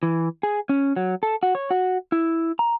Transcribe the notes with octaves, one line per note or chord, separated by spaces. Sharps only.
E3
G#4
C#4
F#3
A4
F#4
C#5
F#4
E4
A#5